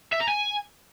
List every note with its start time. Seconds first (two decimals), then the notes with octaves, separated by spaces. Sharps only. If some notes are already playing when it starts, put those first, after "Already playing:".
0.12 E5
0.20 A#5
0.28 G#5